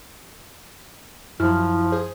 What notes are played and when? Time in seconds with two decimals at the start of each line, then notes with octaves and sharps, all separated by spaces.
1.40 F#2 F3 E4 F6
1.92 G#4 C5